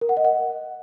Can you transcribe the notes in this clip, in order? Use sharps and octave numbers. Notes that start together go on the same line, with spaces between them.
A#4
F#5
D#5
F#5